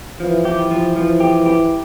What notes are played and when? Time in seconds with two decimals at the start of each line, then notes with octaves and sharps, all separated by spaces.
0.20 E3 F3
0.45 G4
0.71 F3
0.96 F3
1.20 G4
1.46 G4